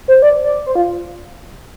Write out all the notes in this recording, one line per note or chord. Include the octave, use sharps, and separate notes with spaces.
C5
D5
D5
C5
F4